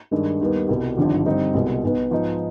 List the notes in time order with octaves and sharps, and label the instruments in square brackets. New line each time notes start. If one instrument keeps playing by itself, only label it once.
[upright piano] G2 D#3 G#3 D4
D#2 D#3 G3 B3
C2 B2 G3
G#1 G2 D3 F3
G2 D3 G3 C4 D#4
C2 B2 G#3
B1 B2 B3 D#4
G#2 F3 B3 D#4